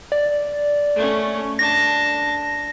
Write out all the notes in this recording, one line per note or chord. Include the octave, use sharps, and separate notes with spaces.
D5
A3 C#4
D4 A5 A#6